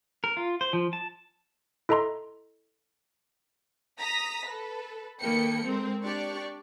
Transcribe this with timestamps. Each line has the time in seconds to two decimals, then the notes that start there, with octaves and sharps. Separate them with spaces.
0.24 A#4
0.37 F4
0.61 C5
0.73 F3
0.93 A5
1.89 E4 A4 D#5 A#5 C6
4.00 A#5 D#6 A#6 B6
4.47 A4 B4
5.21 D#3 A#3 A4 B4 G5 C#7
5.64 G#3 C4 A#4
6.04 D4 G4 D5 C#6